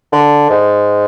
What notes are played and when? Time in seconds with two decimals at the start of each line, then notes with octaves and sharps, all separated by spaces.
0.12 D3
0.50 G#2